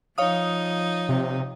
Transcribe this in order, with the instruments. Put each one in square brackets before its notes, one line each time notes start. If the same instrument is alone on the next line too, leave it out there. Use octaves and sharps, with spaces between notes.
[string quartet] F3 D#4 [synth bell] C#5 F5 D#6
[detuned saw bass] C3